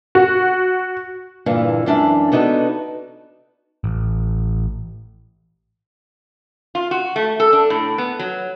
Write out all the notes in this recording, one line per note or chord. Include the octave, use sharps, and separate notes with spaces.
F#4
G2 A#2 D3 E3
F#2 E3 G#3 D4 E5
B3 D4 D#4 F#4 A4
A1
F4
F#4
A3
A4
D4
A2
B3
F#3